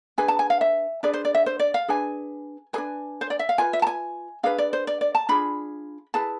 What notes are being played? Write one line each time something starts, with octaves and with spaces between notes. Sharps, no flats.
D4 G#4 B4 G#5
A5
G#5
F5
E5
D4 G#4 B4 D5
C5
D5
E5
C5
D5
F5
D4 G#4 B4 G#5
D4 G#4 B4 G#5
C5
D5
E5
F5
F4 B4 G#5
E5
A5
G#5
D4 G#4 B4 F5
D5
C5
D5
D5
A5
D4 F4 G#4 B5
E4 G#4 B4 A5